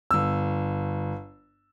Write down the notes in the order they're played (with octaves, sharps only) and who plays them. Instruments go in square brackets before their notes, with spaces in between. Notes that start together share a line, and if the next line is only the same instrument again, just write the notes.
[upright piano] G1 E6